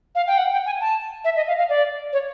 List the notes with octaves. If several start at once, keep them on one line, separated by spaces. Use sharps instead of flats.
F5
G5
F#5
G5
G#5
A5
E5
D#5
F5
F5
D5
C#5